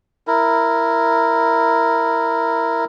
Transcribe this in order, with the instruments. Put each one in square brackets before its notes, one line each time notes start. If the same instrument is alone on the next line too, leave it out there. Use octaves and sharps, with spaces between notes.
[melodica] E4 A#4